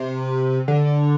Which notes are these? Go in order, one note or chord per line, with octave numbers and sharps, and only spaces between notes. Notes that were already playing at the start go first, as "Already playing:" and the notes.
Already playing: C3
D3